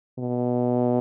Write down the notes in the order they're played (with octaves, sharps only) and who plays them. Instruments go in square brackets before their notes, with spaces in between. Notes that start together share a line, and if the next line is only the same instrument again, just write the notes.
[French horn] B2